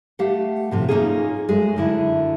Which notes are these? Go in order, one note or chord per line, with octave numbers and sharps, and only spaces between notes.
A3 G4 F5 F#5
A2 C3 F3
A#3 B3 C#4 D#4 F4 G#4
F#2 G#3 A3 G#4
F#2 D3 E4